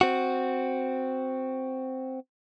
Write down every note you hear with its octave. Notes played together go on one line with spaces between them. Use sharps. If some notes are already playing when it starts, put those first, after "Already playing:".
C4 F#4